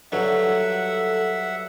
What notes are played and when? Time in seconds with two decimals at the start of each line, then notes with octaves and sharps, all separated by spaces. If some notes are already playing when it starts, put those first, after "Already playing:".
0.12 G2 F#3 A4 E5 F#5